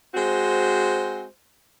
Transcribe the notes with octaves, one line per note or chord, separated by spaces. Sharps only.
G#3 C4 F#4 C5